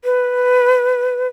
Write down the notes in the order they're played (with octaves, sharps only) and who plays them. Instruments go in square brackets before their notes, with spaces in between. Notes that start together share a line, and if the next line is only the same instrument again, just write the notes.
[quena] B4